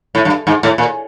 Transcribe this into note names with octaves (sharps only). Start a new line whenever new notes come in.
A2
G2
G#2
A2
A#2